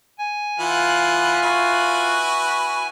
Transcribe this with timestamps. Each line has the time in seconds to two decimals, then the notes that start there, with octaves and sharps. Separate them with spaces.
0.19 G#5
0.60 E3 F4 B4 F#5
1.42 E4 F#4 B4